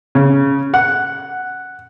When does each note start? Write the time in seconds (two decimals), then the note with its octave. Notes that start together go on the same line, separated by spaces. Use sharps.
0.15 C#3
0.74 F#5